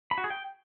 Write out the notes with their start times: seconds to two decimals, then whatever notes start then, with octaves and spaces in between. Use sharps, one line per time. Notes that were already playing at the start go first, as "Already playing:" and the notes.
0.11 B5
0.18 F#4
0.24 G#4
0.30 G5